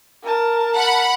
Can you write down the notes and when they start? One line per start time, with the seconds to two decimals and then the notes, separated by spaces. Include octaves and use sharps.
0.23 A#4 A5
0.75 F#5 B5